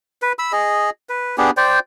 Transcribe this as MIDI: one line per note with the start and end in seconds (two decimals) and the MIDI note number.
0.22 0.33 71
0.39 0.52 83
0.39 0.52 88
0.52 0.90 68
0.52 0.90 75
1.09 1.36 71
1.38 1.51 59
1.38 1.51 62
1.38 1.51 67
1.38 1.51 68
1.57 1.79 72
1.57 1.79 74
1.57 1.79 79